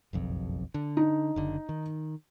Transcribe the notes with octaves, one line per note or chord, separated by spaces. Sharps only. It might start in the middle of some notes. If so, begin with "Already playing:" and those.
F#1 B1 F2
D3
D#4
F#1 D3
D#3